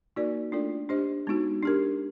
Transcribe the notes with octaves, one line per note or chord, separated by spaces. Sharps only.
A#3 D#4 F#4 A#4 D5
A3 D4 F4 A4 D5
D4 G4 C5 D#5
G#3 B3 D#4 F#4
D4 G4 A#4